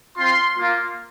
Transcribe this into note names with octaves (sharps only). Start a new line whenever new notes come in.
C4 F4 C6
A#3 F4